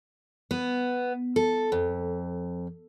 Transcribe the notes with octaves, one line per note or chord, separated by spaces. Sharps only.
B3
A4
F2